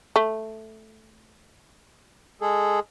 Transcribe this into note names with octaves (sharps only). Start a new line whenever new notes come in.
A3
G#3 G#4 A4